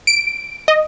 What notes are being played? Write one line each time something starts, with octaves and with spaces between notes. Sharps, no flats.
D7
D#5